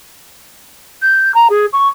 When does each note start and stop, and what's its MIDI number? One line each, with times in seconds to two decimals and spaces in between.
1.02 1.32 91
1.35 1.48 82
1.50 1.66 68
1.73 1.88 85